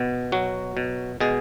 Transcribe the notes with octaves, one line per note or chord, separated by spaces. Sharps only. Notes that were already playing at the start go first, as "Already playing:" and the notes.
Already playing: B2
F#3 F#4
B2
B2 G#3 G#4